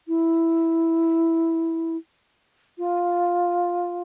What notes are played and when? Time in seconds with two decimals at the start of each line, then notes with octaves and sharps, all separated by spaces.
0.08 E4
2.78 F4